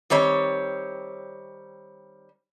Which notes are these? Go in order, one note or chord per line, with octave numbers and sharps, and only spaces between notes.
D#3 G3 C4 C#5